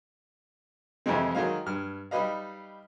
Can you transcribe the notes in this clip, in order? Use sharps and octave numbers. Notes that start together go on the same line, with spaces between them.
F2 C3 E3 F3 G#3 C4
D#3 F#3 G#3 F5
G2 F6
G3 D#4 G4 B4 D#5 F5